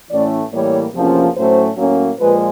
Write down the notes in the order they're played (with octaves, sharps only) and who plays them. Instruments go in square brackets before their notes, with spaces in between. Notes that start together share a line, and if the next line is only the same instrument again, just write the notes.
[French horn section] A2 E3 A3 C#4 D5
A2 E3 G3 A#3 C#5
E2 C3 F3 A#3 C#4
A2 F#3 A3 C#4 C5
A2 F#3 A#3 C#4
A#2 F3 G#3 B4